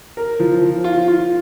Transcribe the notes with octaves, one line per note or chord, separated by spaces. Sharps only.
A#4
F3
F3
F4
F4